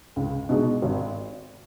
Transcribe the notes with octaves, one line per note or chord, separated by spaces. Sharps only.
C#2
B2 G#3 D#4
G#1